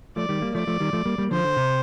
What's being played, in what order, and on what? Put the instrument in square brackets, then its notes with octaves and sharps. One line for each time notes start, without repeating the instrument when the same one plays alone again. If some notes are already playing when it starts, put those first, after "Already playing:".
[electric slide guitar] F3 A3 [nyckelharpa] D5
[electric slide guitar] D#3 G3
G3 A#3
[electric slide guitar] F3 A3 [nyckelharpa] D5
[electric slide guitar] F3 A3
D#3 G3
F3 A3
G3 A#3
G3 A#3
[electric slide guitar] D3 F3 [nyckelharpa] C5
[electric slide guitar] D3
C3